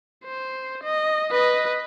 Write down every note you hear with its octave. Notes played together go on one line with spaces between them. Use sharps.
C5
D#5
B4 D#5